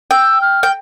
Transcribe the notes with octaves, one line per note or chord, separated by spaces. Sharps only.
G5 E6
F6
G5